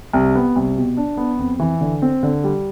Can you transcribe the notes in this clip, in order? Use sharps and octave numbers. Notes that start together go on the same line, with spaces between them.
C2
B3
C2
B2
D4
B3
F2
E3
D3
C4
D3
G3